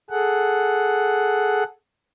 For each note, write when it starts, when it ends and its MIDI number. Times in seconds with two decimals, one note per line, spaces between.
0.10 1.64 68
0.10 1.64 69
0.10 1.64 78